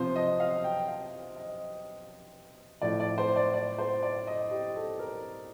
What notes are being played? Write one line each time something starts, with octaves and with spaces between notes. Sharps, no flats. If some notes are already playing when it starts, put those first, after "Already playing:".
Already playing: C3 F3 C5
D#5
F5
G5
F5
D#5
A2 F3 D5
D5
C5
D5
D5
C5
D5
D#5
G4
A4
A#4